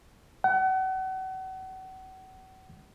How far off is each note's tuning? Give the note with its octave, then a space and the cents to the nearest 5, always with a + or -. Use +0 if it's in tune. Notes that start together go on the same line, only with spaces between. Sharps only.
F#5 +35